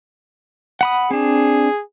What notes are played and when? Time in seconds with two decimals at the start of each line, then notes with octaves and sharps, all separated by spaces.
0.81 F#5 B5 D#6
1.11 C4 D4 G#4